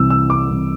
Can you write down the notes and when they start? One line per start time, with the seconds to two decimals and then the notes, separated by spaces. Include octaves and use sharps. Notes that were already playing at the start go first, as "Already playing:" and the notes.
Already playing: C2 C3 E3 E6
0.10 E6
0.30 D6
0.50 C2 C3 E3